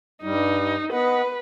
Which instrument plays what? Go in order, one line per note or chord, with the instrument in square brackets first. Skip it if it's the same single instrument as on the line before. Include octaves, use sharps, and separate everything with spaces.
[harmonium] G2 G3 [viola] D#4
[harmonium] B3 D#5 F#5 [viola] B4